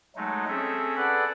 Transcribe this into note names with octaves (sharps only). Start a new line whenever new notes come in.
F#3 G#3 A3 D#4
C4 C#4 G#4 A4 E5
G#4 A4 B4 D5 F#5